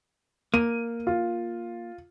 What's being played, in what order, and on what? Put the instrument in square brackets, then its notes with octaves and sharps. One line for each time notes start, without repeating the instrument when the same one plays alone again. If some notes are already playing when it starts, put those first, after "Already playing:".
[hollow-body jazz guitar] A#3 [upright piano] D#7
[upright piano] F4